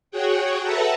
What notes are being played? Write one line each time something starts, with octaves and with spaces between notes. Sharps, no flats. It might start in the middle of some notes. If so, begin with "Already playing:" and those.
F#4 G#4 C#5 F#5 G5
A4 B4 E5 F#5 A5 A#5